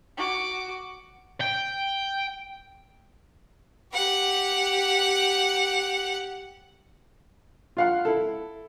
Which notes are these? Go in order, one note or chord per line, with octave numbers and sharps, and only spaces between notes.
F#4 D6
G5
G4 F#5
F4 F5 F#5
E4 A4